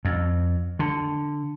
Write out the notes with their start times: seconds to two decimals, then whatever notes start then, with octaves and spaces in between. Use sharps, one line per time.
0.05 F2
0.79 D3